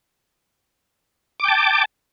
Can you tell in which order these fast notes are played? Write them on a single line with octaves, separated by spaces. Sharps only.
D6 G5 A5